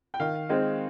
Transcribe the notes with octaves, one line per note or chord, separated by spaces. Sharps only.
G5
D#3 F5
G#3 C4 D#4